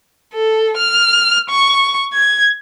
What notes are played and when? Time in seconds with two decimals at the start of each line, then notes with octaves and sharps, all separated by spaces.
0.34 A4
0.77 F6
1.50 C#6
2.13 G#6